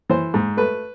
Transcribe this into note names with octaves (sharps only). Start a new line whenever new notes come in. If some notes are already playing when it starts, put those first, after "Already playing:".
E3 C5
G#2
A3 B4